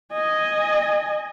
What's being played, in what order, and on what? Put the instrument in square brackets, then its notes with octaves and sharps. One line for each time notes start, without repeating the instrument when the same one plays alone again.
[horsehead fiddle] D#5 G#5